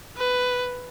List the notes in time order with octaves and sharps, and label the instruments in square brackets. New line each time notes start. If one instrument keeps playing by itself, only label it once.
[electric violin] B4